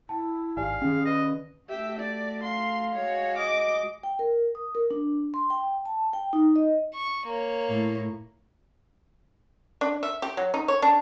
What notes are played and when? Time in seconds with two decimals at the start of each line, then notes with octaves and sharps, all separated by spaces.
0.09 E4 G5 A5
0.57 G#1 G4 D5 F5 G#5
0.82 D#3 C#4 G#4 G5
1.05 B4 D#5 A#6
1.69 A3 F#4 G4 E5
1.99 D5
2.44 F5 C6
2.96 G#3 F#4 C#5
3.38 D#5 D6
4.03 G5
4.19 A#4
4.55 D#6
4.75 A#4
4.91 D4
5.34 C6
5.50 G5
5.85 A5
6.13 G5
6.33 D#4
6.56 D#5
6.95 C#6
7.26 A#3 C#5
7.69 A2
9.81 D4
10.03 E5
10.22 G4
10.37 F#3
10.54 D#4
10.68 C#5
10.82 D4